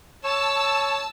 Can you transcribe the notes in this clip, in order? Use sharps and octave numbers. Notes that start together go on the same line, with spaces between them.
C#5 A5 E6